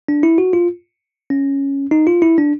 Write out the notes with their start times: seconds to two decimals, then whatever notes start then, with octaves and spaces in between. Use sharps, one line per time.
0.08 D4
0.23 E4
0.38 F#4
0.53 F4
1.30 C#4
1.91 D#4
2.07 F4
2.22 E4
2.38 D4